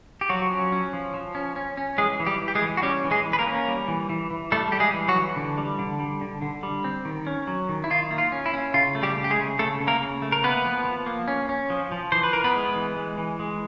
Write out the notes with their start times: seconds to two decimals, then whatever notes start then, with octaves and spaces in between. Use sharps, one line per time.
0.21 G4
0.29 F3 F#3 F#4
0.50 C#4
0.72 C#4
0.93 F3
1.14 F3
1.35 C#4
1.56 C#4
1.77 C#4
1.98 E3 G#3 G#4
2.20 E3
2.26 G3 G4
2.41 E3
2.48 G4
2.55 G#3 G#4
2.62 E3
2.77 F#4
2.82 G3 C#4 G4
3.04 E3
3.11 G#3 G#4
3.25 E3
3.33 B4
3.39 A#3 A#4
3.47 C#4
3.68 G3
3.88 E3
4.09 E3
4.31 E3
4.52 G3 A3 A4
4.72 G3 G4
4.80 G#3 G#4
4.94 E3
5.08 F#3 F#4
5.16 E3
5.36 D3
5.58 G3
5.79 D3
5.99 G3
6.21 D3
6.42 D3
6.63 G3
6.84 C4
7.05 D#3
7.27 C#4
7.47 F#3
7.69 D#3
7.84 E4
7.90 D#3 F4
8.11 A#3
8.18 F4
8.32 C#4
8.46 E4
8.53 C#4
8.74 C#3 F4
8.95 A3
9.03 G3 G4
9.17 C#3
9.24 G4
9.31 G#3 G#4
9.38 C#3
9.59 C#3 A3 A4
9.81 C#3
9.87 A#3 A#4
10.01 C#3
10.22 A3
10.32 A#4
10.43 A#3 B3 B4
10.65 F3
10.85 F3
11.06 A#3
11.28 C#4
11.49 C#4
11.70 F3
11.92 F3
12.12 E3 C5
12.23 B4
12.33 E3 A#4
12.44 B3 B4
12.55 G#3
12.76 E3
12.96 G#3
13.18 E3
13.40 G#3